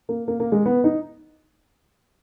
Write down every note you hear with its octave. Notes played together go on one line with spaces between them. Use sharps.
A#3
A#3
A#3
G#3
B3
D#4